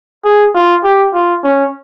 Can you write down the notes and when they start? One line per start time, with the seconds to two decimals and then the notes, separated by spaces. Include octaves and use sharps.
0.24 G#4
0.54 F4
0.84 G4
1.14 F4
1.44 C#4